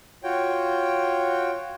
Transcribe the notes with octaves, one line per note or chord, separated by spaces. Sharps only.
F4 F#4 C#5 G5